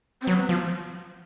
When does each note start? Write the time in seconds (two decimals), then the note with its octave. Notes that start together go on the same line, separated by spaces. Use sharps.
0.21 C4
0.27 F#3 B3
0.49 F3